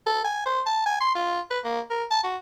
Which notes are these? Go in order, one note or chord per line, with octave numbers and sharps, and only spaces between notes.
A4
G#5
C5
A5
G#5
C6
F4
B4
A#3
A#4
A5
F#4